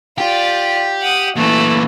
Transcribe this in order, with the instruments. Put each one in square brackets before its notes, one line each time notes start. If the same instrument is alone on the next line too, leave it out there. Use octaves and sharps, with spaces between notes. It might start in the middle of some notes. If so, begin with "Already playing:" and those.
[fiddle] F4 D5 [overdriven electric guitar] G4
[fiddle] F#5 D#6
[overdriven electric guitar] A#2 E3 [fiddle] A3 E4